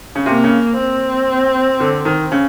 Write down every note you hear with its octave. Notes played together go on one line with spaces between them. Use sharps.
C#3
C3 A#3
C#3
C4
D3
D#3
C#3